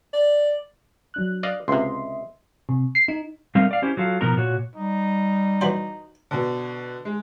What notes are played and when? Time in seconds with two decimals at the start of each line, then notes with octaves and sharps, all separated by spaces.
0.13 D5
1.14 F#3 D4 F#6
1.43 D5 D#5 F5
1.68 C#2 C3 D#5 E5 C6
2.69 C3
2.95 C7
3.08 D#4
3.55 G3 A3 C4 D#4 A#4 F5
3.71 D5 F5
3.82 C#4 E4 G4 C5
3.97 F#3 F4 A4 F5
4.21 B2 F3 B3 D#4 A#4 A#5
4.36 A#2 F#4 C#5
4.76 G3 D#4
5.61 E3 F#3 C5
6.31 B2 D3
7.05 G#3